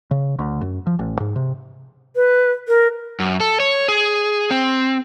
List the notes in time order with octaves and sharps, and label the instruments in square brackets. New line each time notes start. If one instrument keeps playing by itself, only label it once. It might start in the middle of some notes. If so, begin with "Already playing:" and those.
[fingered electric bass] C#3
D2
F#2
F3
A1
G#2
C3
[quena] B4
A#4
[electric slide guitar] F#2
A4
C#5
G#4
C4